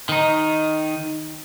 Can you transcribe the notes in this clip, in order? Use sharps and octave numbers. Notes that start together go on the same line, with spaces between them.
D#3 D#4